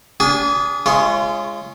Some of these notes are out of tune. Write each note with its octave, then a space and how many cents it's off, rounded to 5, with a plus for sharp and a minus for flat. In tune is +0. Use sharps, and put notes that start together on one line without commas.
D4 -35 G#4 -20 G#5 +0
G#3 +0 F4 -35 C#5 -15